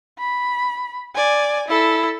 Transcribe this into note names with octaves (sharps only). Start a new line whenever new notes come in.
B5
D5 G#5
E4 A4